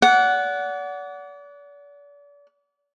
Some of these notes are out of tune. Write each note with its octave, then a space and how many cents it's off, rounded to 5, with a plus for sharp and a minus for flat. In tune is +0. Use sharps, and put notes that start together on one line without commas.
D5 -35 F#5 +0